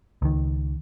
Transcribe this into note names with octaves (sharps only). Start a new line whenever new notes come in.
C#2 D#3